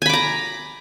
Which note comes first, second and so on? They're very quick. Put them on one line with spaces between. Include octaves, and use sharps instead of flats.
G#5 B5 D6 A#5